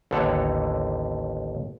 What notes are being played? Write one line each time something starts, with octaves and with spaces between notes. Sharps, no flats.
A1 D#2 D3 A4 C#5 F#5